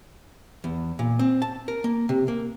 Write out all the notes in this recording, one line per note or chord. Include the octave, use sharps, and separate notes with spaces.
E2
A#2
C4
A5
A#4
A#3
C3
A#3